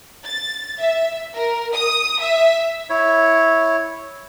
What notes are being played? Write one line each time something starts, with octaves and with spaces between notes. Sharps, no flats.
A6
E5
A#4
D#6
E5
E4 C#5